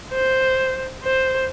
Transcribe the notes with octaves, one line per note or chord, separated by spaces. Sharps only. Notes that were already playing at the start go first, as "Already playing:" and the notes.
C5
C5